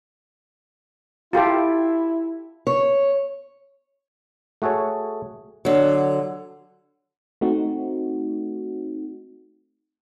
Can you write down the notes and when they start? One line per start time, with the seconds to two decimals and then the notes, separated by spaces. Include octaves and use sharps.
1.33 E4 F4 G4 A4
2.67 C#5
4.62 A3 F#4 G#4 A4 C#5
5.65 D3 F#3
7.41 A3 C4 D#4 F#4